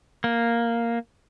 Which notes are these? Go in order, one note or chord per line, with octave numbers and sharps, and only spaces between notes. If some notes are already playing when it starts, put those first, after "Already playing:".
A#3